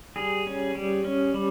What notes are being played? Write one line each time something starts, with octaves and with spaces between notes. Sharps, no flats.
G3 G#4
C#4
G3
C#4
G3